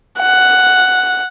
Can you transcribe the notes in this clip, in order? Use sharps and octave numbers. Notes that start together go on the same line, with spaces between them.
F#5